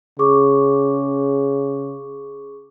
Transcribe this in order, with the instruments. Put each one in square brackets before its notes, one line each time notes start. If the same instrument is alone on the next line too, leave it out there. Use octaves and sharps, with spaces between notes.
[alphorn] C#3 [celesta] G#4 C#6 D6